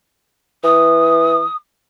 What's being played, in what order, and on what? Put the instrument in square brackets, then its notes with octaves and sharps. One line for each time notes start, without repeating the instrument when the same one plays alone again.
[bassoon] E3 [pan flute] D#6